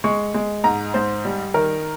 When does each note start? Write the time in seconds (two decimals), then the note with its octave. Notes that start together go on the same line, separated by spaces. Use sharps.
0.04 G#3 C#6
0.34 G#3
0.64 G#2 A#5
0.94 G#2 C5
1.25 G3
1.54 D#3 A#4